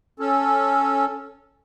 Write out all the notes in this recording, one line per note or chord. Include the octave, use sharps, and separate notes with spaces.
C#4 A4